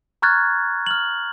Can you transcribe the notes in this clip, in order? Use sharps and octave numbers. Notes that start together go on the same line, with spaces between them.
A#5 C#6 F6 F#6 G#6 A6
F6 F#7